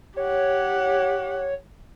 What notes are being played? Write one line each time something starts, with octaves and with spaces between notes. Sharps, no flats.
G4 C#5 F#5